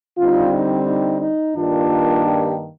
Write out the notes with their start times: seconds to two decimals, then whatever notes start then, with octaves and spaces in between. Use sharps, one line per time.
0.18 D3 G3 C4 D#4 F4
0.53 D#4
0.87 D#4
1.22 D#4
1.56 G2 D#3 A#3 D4 F4
2.26 G4